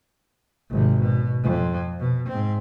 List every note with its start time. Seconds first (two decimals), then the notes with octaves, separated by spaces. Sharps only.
0.70 G#1 C3
1.00 B2
1.43 F2
2.00 B2
2.28 G#2 C4